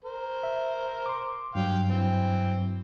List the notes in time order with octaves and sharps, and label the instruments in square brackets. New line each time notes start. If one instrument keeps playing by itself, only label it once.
[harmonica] A#4 C5
[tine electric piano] E5
C6 D6
[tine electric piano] G2 F#3 [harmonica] F5 G5
[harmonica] E3 C4